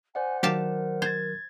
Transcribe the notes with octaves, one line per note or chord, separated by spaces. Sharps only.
C5 D5 F#5 G#5
D#3 F#3 G4 A#4 F5 A5
C5 G#6 A6